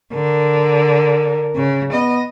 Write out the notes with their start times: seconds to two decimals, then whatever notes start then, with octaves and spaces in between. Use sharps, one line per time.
0.13 D3 A#4
1.56 C#3
1.93 B3 D#5